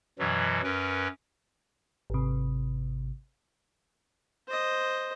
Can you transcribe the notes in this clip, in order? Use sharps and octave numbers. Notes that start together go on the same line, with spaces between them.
F#2 B2 E3 F#3
F#2 C#4 A#4 B4
G#1 C3
C5 D#5